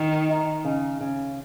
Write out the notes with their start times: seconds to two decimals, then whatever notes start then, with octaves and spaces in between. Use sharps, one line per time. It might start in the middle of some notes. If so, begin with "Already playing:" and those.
Already playing: D#3
0.29 D#4
0.65 C#3
1.01 C#3